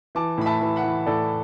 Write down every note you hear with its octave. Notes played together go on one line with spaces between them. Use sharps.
E3 A5 D6
A2 B5
E5 A5
E3
F#5 B5
E3
A2 A4 D5